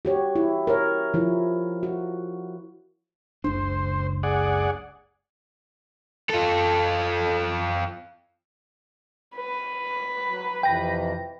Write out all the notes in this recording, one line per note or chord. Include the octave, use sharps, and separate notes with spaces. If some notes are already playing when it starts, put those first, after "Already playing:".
F#4 G4 C#5
E4
A#4 C#5
F3 E4
F#4
F#1 C#2 D4 C5
G#4 D5 F#5
F4 A4
B4
F#3
F2 C3 E3 G5 A#6